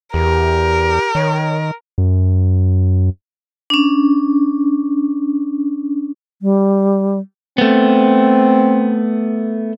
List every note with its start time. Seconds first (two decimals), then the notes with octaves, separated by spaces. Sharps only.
0.14 E2 G4 A#4
1.15 D#3 C#5
1.98 F#2
3.70 C#4 D4
6.42 G3
7.58 A3 B3 C4